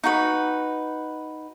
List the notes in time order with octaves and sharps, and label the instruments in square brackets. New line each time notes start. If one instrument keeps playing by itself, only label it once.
[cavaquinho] D#4 F#4 B4